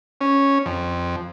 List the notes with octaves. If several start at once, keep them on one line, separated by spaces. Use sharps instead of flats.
C#4
F2